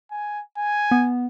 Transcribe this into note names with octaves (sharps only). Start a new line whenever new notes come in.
G#5
G#5
B3